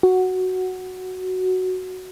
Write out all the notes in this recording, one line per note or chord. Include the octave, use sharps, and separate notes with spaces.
F#4